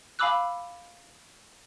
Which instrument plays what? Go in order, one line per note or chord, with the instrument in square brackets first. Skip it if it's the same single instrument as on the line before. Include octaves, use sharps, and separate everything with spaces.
[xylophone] F5 G#5 B5 D6 E6 F#6